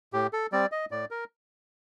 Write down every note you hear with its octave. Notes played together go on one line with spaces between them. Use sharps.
A2 G4
A4
G3 C4 D5
D#5
A2 D5
A#4